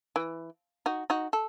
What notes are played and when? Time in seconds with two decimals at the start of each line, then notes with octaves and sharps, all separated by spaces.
0.16 E3
0.86 D#4 F#4
1.10 D#4 F#4
1.33 A4